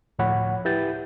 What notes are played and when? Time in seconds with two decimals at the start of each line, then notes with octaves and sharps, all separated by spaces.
0.19 D2 A2 F3 C#5 F#5 B5
0.65 E4 G4 B4 G6 A6